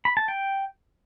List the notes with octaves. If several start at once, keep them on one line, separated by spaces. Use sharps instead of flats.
B5
A5
G5